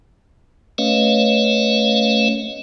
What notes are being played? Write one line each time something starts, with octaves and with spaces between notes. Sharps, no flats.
A3 C#4 B4 C#5 D#5 F5